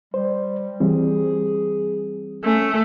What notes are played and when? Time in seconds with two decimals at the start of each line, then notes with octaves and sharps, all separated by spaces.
0.14 G3 C5
0.80 E3 G3 C4 G#4
2.44 A3 C#4